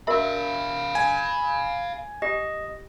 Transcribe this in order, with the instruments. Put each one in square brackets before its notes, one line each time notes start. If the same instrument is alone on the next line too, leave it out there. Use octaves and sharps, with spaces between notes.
[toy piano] F#4 A#4 E5 [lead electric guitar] F5 B5
[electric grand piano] G#5
[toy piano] G4 [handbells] D#5